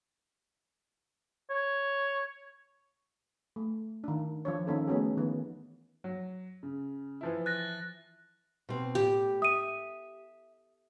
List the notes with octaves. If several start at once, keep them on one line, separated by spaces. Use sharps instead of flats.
C#5
A3
D#3 D4
F3 D4 C#5
D#3 A#3 C#4 D#4 A4
A3 B3 C#4 F#4 G#4
D#3 E3 B3
F#3
C#3
E3 F3 E4
F#6 A6 A#6
B2 C4
A2 G4
E5 D#6 D#7